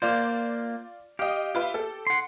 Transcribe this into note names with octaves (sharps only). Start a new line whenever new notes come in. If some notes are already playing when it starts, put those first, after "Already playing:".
A#3 F4 C5 D5
G4 D#5 F5
F4 B4 E5
A4
F#5 C6